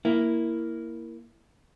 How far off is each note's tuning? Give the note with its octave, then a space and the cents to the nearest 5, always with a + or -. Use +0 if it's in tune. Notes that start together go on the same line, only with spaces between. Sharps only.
A#3 +0 E4 +0